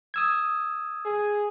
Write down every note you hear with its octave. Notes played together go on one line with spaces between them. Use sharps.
D#6 E6 G#6
G#4